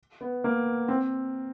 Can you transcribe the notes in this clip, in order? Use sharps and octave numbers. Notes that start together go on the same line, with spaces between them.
B3
A#3
C4